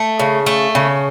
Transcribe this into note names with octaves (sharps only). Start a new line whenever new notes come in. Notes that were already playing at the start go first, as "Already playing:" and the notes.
Already playing: A3
C#3
A3
C#3